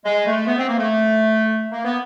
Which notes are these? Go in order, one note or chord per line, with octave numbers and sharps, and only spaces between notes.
G#3
A3
B3
C4
A#3
A3
A#3
B3